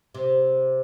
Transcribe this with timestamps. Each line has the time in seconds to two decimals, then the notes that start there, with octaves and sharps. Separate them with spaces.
0.15 C3